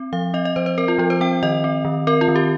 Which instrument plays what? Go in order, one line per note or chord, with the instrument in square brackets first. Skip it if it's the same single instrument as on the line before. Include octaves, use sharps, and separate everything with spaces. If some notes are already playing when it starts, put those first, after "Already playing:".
Already playing: [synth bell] C4
F3 F5
C4 D#5
D#5
F3 C5
C5
C4 A#4
F4
F3 F4
C5
C4 G5
D#3 D#5
C4
D#3
C4 A#4
F4
D#3
G4